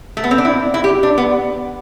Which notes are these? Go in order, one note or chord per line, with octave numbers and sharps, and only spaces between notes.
A3
B3
C4
D4
E4
E4
G4
D4
B3